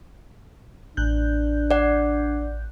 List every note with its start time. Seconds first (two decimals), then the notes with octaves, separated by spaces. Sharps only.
0.97 A1 D4 F#6 G6
1.71 D5 F#5